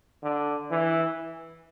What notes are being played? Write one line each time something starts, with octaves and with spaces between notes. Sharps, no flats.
D3
E3